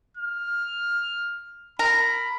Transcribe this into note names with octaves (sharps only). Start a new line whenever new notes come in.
F6
A#4 B5